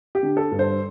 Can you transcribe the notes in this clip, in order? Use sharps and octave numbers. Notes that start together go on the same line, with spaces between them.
G4
D3
A4
G2
C5